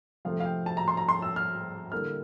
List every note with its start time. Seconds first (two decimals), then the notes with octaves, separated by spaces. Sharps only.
0.25 C3 F3 A3 C4 F5
0.40 F5
0.45 G5
0.66 A5
0.77 A#5
0.88 C6
0.97 A#5
1.09 C6
1.22 E6
1.36 F6
1.92 D3 G3 A#3 E4 F6